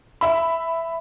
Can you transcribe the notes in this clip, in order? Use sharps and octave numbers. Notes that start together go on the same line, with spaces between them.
E5 B5